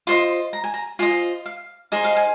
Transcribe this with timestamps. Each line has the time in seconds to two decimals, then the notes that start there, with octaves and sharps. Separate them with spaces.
0.07 F4 C5 D#5 C6
0.53 A#5
0.64 G#5
0.74 A#5
0.99 F4 C5 D#5 G#5
1.46 F5
1.92 D#4 G#4 C5 D#5 G#5
2.04 F5
2.17 G#5